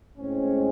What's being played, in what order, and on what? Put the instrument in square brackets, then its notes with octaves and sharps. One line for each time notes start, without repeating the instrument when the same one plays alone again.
[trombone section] A2 G#3 C4 C#4